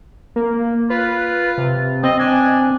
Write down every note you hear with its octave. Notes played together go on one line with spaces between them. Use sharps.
A#3
F4 B4
C3
C4 D#5
D4 G#5